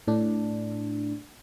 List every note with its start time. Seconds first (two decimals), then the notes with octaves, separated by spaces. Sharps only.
0.07 A2 D4